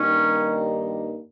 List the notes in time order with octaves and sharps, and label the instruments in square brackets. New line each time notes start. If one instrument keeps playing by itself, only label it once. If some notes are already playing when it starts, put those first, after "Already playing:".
Already playing: [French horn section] G2 D#3 G3 A#3 D#4 [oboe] C#4